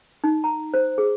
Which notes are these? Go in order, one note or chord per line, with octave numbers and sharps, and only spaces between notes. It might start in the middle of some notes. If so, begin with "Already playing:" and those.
D#4
A#5
C5
G#4